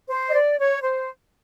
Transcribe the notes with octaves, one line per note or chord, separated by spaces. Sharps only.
C5
D#5
D5
C#5
C5